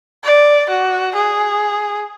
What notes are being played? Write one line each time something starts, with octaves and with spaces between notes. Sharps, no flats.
D5
F#4
G#4